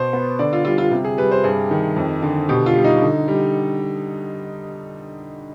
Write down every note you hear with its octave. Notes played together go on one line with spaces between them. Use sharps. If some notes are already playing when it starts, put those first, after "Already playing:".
Already playing: B2 C5
B3
D3 D5
F4
G3 F4
F4
C3
G#4
G3 B4
C5
G2 G#4
D#3
F2
D3
B2 G4
F4
G3
D#4
D3
G3